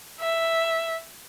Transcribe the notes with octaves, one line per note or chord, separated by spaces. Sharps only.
E5